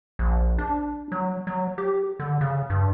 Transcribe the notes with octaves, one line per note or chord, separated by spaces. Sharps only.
A#1
D4
F#3
F#3
G4
D3
C#3
G2